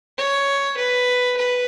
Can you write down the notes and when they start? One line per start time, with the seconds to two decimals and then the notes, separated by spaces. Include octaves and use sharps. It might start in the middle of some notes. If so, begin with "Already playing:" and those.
0.18 C#5
0.77 B4
1.37 B4